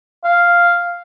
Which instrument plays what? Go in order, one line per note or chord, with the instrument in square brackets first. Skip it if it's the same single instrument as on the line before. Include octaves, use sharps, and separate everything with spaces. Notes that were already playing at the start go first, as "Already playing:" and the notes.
[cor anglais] F5